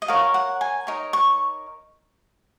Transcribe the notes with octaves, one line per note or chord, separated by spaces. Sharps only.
D#5
F#4 A#4 C#5 F5
F#5
G#5
D#4 A#4 C#5
C#6